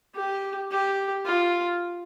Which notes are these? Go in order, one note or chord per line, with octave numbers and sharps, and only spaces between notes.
G4
G4
F4